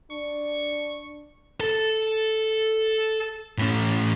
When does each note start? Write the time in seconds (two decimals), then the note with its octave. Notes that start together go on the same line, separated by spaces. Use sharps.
0.11 D4 C#6
1.60 A4 A5
3.58 A2 C#4